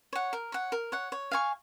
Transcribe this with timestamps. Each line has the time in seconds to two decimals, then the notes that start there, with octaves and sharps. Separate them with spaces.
0.13 C#5 F#5
0.33 A#4
0.52 C#5 F#5
0.72 A#4
0.92 C#5 F#5
1.12 C#5
1.31 F5 G#5 C#6